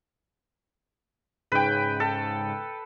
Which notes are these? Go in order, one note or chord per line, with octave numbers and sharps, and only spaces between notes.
G#2 C#3 B4 G5
A4